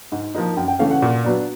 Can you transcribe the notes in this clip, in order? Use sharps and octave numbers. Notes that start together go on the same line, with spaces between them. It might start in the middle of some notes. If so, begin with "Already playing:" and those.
G#2
F3 A#3 D#4
F#2 G5
G5
C#3 E3 A3 C#4 F5
F#5
A#2
F#3 B3 D4